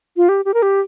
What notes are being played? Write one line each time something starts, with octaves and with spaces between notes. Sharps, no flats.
F4
G4
G4
A#4
G4